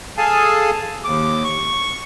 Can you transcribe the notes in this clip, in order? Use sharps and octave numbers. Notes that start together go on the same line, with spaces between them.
G#4 A4 F5 G#5 A5
D#2 D6
C#6